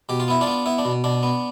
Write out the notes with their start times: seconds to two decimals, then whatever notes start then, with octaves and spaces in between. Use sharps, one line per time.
0.09 B2 G4
0.20 F4
0.28 B3 E4
0.41 D4 F4
0.47 B3
0.66 B3 E4
0.78 D4
0.85 B2
1.04 B2 D4
1.23 B3